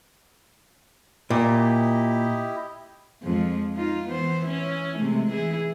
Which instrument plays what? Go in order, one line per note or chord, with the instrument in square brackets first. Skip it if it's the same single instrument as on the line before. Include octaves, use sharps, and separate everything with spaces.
[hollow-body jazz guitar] A#2 [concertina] E4 G4 D#5
[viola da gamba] F2 F3 G#3
D#4 F4
E3 B3 C5
C#4 E4
C3 G#3 A3
E3 E4 G#4